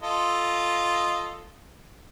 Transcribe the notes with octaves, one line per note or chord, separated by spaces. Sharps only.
F4 A4 D#5